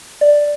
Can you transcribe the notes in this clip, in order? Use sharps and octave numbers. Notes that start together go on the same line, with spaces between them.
D5